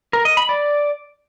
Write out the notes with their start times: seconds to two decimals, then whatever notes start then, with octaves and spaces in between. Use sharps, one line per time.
0.13 A#4
0.25 D#5
0.37 B5
0.49 D5